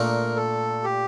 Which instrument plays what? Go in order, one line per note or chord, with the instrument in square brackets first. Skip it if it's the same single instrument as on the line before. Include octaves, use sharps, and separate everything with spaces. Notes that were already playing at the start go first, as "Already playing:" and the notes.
Already playing: [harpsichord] A#2 A3 D4 [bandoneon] A#4
[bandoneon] A4
G4